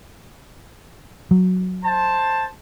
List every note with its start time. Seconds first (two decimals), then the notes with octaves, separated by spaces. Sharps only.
1.31 F#3
1.83 C5 A5